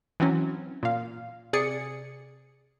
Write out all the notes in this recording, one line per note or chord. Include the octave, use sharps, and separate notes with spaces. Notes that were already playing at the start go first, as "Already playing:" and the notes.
E3 F#3 C4 C#4
A#2 F5
C3 G#4 D5 C#7